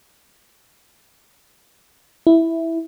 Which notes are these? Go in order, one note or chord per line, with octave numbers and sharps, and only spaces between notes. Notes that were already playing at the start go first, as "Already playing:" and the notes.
E4